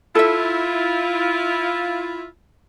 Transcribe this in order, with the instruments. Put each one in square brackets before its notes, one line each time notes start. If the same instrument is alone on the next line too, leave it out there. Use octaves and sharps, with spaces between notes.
[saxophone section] E4 F4 [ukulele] A4 E5